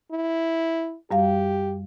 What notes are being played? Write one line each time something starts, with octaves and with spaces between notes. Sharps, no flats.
E4
F#2 G3 G4 F5